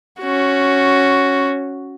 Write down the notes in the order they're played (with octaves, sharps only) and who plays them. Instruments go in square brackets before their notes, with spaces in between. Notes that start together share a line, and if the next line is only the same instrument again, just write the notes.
[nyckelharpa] C#4 F#4